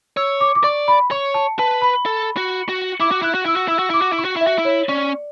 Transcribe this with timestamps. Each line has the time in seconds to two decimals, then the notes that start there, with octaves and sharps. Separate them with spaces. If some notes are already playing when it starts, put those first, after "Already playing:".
0.17 C#5 E6
0.41 D6
0.55 D6
0.64 D5 C#6
0.88 B5
1.11 C#5 C#6
1.34 A5
1.59 B4 A5
1.82 B5
2.06 A4
2.37 F#4
2.69 F#4
3.00 E4 D6
3.11 F#4
3.22 E4 F#6
3.34 F#4
3.45 E4 E6
3.56 F#4
3.68 E4 E6
3.79 F#4
3.90 E4 D6
4.02 F#4
4.13 E4
4.18 C#6
4.25 F#4
4.36 E4 E5
4.47 F#4
4.59 E4
4.65 C#5
4.89 C#4 D5